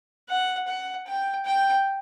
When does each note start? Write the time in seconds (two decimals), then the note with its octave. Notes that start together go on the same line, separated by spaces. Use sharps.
0.29 F#5
0.67 F#5
1.07 G5
1.45 G5